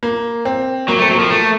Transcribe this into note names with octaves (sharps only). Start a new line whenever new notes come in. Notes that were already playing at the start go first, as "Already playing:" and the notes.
A#3
C4
F#3 A#3
A3 C4
F#3
F3 A#3
A3